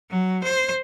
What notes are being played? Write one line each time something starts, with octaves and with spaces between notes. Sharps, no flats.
F#3
C5